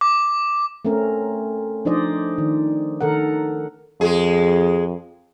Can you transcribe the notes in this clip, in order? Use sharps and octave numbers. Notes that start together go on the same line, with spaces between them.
D6
A3 C4 C#4 A#4
F3 D4 D#4 C5 D5 D#5
D#3
D#3 A4 A#4 F#5
F2 G#3 G#4